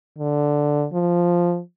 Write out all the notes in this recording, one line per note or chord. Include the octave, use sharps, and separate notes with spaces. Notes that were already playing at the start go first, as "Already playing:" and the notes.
D3
F3